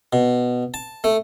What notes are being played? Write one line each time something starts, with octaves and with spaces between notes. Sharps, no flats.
B2
A5
A3